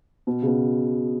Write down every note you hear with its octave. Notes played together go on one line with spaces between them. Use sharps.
B2
C#3
B2